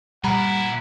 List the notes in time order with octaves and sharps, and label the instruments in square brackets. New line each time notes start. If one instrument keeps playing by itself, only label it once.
[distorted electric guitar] A#2 E4 [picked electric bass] G3 [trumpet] F#5 [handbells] A#5 B5